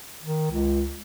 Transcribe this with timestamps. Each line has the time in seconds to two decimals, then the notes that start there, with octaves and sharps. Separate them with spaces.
0.23 D#3
0.51 C#2